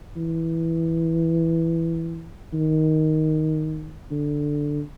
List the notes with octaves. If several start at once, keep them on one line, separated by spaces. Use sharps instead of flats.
E3
D#3
D3